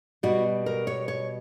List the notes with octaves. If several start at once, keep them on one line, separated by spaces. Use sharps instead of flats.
B2 G3 F#4
A#4
C#5
C#5